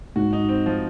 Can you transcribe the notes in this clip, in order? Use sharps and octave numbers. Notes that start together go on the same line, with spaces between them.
G#2 F#4
D#4
C4
F3